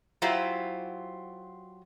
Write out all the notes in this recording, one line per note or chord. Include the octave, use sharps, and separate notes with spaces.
F#3 E4 F4 G4 C5